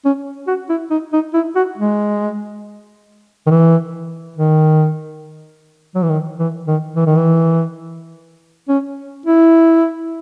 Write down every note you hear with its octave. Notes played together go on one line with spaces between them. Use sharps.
C#4
F#4
E4
D#4
D#4
E4
F#4
G#3
D#3
E3
D#3
F#3
E3
D#3
E3
D#3
E3
D#3
E3
C#4
E4